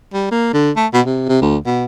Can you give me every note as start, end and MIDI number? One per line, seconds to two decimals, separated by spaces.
0.14 0.27 55
0.31 0.51 58
0.53 0.71 50
0.76 0.87 57
0.93 1.01 47
1.06 1.25 48
1.29 1.41 48
1.42 1.57 38
1.66 1.85 47